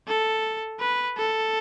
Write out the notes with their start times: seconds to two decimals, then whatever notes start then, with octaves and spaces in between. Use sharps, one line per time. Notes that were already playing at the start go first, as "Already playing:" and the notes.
0.08 A4
0.80 B4
1.18 A4